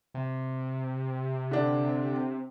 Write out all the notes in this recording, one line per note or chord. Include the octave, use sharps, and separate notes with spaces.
C3
D3 D4